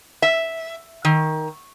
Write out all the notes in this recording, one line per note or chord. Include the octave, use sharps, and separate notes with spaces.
E5
D#3